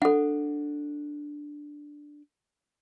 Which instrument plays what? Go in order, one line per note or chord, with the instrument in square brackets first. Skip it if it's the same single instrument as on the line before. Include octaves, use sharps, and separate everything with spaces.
[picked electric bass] D4 [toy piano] A4 F#5